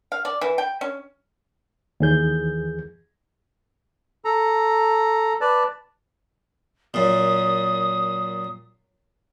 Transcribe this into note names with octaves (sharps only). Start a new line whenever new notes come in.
F5
D5
E3
G5
C#4
D#2 E3 G#4 G6
A4 A#5
B4 D5 A5
F#2 A#2 D#6